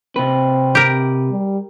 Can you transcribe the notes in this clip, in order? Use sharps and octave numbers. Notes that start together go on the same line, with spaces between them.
C3 C4 B4
G4 A#4
G3